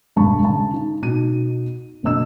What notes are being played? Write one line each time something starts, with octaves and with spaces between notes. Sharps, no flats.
E1 G2 A5 B5 C#6
C#3 A5
D#4
B2 D#4 F#4 D#7
F#1 B2 D4 D#5 E6 E7